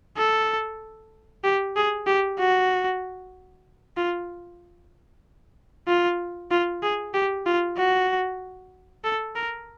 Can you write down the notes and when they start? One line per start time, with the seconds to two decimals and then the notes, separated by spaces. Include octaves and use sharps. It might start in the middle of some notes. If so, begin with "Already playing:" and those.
0.17 A4
1.44 G4
1.76 G#4
2.07 G4
2.39 F#4
3.97 F4
5.87 F4
6.51 F4
6.83 G#4
7.14 G4
7.46 F4
7.77 F#4
9.04 A4
9.35 A#4